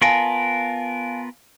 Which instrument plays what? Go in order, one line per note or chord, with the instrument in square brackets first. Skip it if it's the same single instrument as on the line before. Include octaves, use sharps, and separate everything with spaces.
[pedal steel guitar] B3 F4 A#4 [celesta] F5 G#5 A5